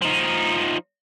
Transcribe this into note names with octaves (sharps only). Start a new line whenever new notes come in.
F3 D#4